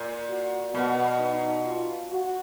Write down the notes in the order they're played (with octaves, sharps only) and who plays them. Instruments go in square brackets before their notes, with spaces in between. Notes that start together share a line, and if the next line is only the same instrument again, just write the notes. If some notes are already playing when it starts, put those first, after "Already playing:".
Already playing: [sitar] A#2
[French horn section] F#4
[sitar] B2 [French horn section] B3
[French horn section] D#4
F4
F#4